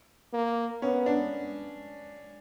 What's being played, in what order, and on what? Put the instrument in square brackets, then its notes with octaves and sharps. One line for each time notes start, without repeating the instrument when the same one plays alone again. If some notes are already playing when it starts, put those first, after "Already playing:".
[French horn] A#3
[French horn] B3 [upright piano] C#4
[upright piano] D4